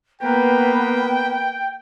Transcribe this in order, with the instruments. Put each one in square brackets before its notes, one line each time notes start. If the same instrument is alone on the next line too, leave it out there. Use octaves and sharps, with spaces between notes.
[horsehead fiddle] A#3 B4 [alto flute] B3 [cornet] G5